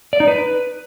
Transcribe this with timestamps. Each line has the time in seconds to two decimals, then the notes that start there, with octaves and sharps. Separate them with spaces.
0.13 D5
0.20 D#4
0.28 B4